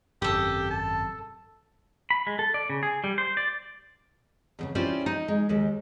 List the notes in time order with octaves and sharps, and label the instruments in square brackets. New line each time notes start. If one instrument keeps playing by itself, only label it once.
[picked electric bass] G#1 F#2 C3 [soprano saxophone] G4 [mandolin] A4 D#6
[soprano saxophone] A5
[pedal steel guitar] B5
G#3
A4
D5
C#3
G#4
G3
C5
D5
[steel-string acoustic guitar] E2 A2 C#3
C#4 E4 F4 G4 C5 D5
D#4
G#3
D#2 G#3 G4